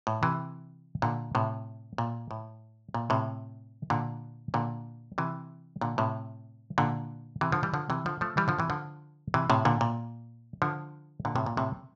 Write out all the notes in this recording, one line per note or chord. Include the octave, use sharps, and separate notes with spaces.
A2
C3 E3
A#2 D3
A2 C3
A#2
A2
A#2
A2 C3
A#2 D3
A#2 D3
C3 E3
A#2 D3
A2 C3
A#2 D3
C3 E3
D3 F3
E3 G3
D3 F3
C3 E3
D3 F3
F3 A3
E3 G3
D3 F3
C3 E3
D3 F3
C3 E3
A2 C3
A#2 D3
A#2
D3 F3
A#2 D3
A2 C3
A#2
A2 C3